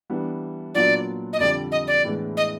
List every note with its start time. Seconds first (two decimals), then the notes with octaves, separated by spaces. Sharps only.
0.10 E3 G3 B3 D4
0.75 A#2 F#3 B3 D4 F4 D5
1.33 D#5
1.39 F2 D3 G3 D5
1.72 D#5
1.87 D5
2.05 A2 E3 G#3 B3 D4
2.37 D#5